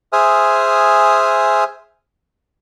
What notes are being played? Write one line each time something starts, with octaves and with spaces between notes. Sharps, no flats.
G#4 C5 E5 G#5 D#6 F6